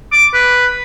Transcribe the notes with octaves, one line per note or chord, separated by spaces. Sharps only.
D6
B4